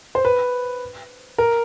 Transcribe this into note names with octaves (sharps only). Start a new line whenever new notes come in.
C5
B4
A#4